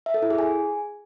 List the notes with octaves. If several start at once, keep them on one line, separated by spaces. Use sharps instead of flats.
E5
A4
E4
G#4
G#5